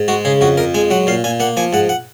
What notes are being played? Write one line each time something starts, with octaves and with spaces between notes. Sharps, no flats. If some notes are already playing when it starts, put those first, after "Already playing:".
Already playing: G#2
G#3 F#4
C#3 G#4
F2 F#4
F2 A#4
G#3 G#5
F#3 F#5
A#2 F5
A#2 G#5
A#3 F#5
F3 G#5
G#2 F#5
F#5